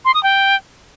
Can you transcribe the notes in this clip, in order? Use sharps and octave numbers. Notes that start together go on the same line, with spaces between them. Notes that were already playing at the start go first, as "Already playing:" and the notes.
C6
D#6
G5